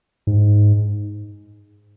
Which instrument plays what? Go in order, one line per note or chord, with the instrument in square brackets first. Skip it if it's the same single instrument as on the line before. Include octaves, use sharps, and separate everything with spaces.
[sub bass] G#2